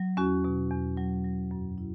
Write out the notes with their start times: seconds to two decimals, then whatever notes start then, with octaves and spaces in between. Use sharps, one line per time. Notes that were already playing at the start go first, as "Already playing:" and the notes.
Already playing: F#3
0.17 E2 C#4 F#4
0.44 B2
0.71 E2
0.97 F#3
1.24 F#3
1.51 F#2
1.78 E4